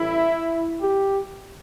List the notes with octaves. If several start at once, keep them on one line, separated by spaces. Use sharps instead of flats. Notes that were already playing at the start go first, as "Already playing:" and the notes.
Already playing: A1 A2 G3 E4
G4